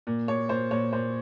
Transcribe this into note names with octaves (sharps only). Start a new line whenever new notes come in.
A#2
A#2 C#5
A#2 C5
A#2 C#5
A#2 C5